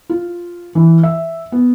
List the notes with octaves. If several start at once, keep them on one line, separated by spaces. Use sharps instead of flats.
F4
E3
E5
B3